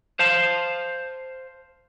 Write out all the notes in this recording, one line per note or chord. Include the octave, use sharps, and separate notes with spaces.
C5 F5 A5